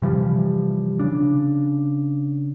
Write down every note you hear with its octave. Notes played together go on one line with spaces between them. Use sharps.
C3 E3 F3 G3
C#3 D4